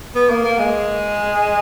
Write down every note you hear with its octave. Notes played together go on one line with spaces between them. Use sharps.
B3
A#3
A#3
G#3